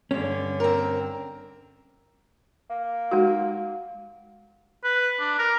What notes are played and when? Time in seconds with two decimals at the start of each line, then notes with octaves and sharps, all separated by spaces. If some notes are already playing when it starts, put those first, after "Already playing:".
0.11 G2 D3 C#4
0.60 C4 A#4
2.70 A#3
3.11 G#3 D#4 F#4
4.84 B4
5.20 D4
5.39 A#4